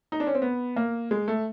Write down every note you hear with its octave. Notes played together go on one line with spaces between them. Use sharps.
D#4
D4
C#4
C4
B3
A#3
G#3
A3